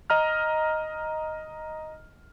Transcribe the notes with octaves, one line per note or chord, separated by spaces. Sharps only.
D#5 A#5 F6